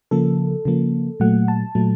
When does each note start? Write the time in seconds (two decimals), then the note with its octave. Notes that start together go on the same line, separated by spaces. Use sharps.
0.11 C#3 F3 A#3 A4
0.65 C#3 F3 A#3
1.20 A#2 F#3 A3 F#5
1.48 A5
1.75 A#2 F#3 A3